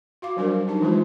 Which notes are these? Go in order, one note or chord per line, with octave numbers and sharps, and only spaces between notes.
F#4 F5 D6
F#3 G3 D4 F#4 A#4 C5
D4
D#4 G4 A5
E3 F3 G#3 D4 F4 C5